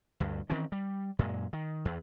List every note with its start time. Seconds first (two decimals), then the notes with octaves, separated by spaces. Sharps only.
0.20 D2 G2
0.50 D#3 E3 C4 C#4
0.72 G3
1.19 F#2 A#2 G#3
1.53 D#3
1.85 E2